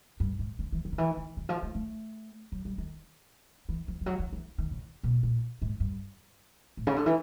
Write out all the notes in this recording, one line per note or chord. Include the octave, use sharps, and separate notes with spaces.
G2
G#2
D3
E3
F3
D#3
E3
D3
D#3
F3
A3
A3
F#3
G3
D#3
E3
F3
F3
F#3
F3
E3
D#3
C#3
B2
A#2
G#2
G2
A2
C#3
D3
E3